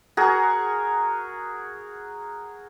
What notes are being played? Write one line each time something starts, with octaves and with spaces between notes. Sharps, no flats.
F#4 G#4 A#4